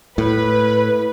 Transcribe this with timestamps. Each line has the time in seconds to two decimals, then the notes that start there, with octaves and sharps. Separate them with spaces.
0.18 A2 B4